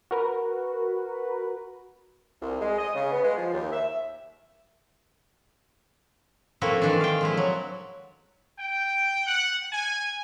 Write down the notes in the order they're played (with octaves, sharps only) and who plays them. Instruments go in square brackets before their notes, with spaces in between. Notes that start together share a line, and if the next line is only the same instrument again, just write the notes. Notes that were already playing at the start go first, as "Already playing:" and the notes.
[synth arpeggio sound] F#4 A#4 B4
[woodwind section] C2
G#3
D#5
C#3
B3
G#3
F3
D#2
E5
[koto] F3 A3 A#3 C4 E4 F#4
D#3 E3 D4
F5 G5
F3 G#3 E4
F#3
[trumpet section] G5
F#5
G#5